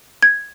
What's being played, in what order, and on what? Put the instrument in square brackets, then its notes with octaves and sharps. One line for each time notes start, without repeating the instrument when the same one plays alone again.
[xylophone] G#6